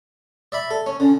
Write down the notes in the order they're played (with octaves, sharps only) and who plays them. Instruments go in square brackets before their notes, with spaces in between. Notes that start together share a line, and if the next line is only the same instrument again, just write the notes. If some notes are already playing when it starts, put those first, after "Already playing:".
[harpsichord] D5 E5 B5
A4
C#4
[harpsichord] D3 [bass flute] C#4